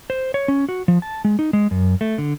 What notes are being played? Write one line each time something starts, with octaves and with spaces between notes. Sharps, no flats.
C5
C#5
C#4
F#4
F3
A5
G#3
D#4
G#3
F#2
A3
D3